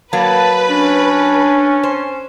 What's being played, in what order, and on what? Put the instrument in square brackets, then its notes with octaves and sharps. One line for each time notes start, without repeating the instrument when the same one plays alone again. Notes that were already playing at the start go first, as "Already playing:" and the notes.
[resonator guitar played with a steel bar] F#3 A#3 [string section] B4 [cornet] A5
[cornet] C#4 [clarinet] D4
[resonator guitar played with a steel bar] C5